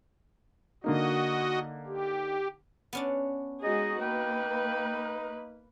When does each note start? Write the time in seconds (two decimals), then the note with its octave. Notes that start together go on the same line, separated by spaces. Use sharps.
0.84 D3 A#3 D#4 F#4 D#5
1.87 G4
2.93 B3 C#4 D4
3.64 G#3 D#4 F#4 G#4 D#5
4.01 A#3 B4 G5